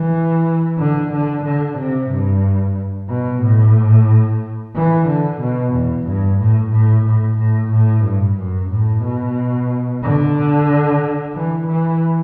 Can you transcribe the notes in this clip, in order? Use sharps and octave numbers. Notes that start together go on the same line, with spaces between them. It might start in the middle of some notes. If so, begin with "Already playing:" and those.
Already playing: E3
D3
D3
D3
C3
G2
B2
A2
E3
D3
B2
E2
G2
A2
A2
A2
A2
A2
G2
F#2
A2
B2
D3
E3
E3